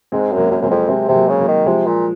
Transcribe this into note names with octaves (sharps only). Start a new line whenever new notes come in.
G#2 G#3 C4
F#2
F#3 A#3
F#2
F#2 G#3 C4
F2
C3 G#3 C4
C3 G#3
F#3 A#3
C#3
F#3 A#3
D#3
C3 F3 G#3
A#2